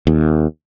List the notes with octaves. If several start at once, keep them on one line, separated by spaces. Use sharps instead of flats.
D#2